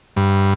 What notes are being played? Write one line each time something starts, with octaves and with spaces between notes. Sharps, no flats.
G2